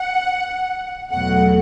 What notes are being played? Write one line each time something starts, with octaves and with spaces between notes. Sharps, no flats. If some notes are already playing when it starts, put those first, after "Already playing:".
Already playing: F#5
E2 B2 F#3 A3 F#5